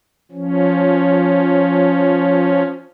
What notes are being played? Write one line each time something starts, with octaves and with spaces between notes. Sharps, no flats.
F3 C#4